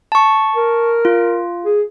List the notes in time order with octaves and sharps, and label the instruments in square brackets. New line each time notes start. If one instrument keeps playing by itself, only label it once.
[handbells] A5 C#6
[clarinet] A#4
[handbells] F4
[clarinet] G#4